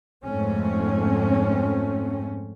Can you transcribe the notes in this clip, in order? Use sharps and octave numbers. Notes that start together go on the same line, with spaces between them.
F2 G#2 A3 C4 C#4